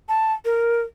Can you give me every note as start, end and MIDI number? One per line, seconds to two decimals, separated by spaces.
0.09 0.33 81
0.45 0.82 70